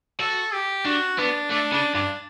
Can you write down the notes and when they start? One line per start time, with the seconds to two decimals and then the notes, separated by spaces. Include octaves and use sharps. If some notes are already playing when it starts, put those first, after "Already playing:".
0.20 F#4 A4
0.53 G4
0.86 D4 F#4
1.19 B3 D4
1.51 A3 D4
1.72 C#3 D4
1.94 G2 D4